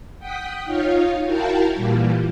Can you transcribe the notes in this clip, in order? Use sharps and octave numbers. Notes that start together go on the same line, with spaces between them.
F#5 G5 D#6 B6
D#4 F4 C#5 F5
E4 F#4 A#4 F5 G5 A5
A#2 E3 G3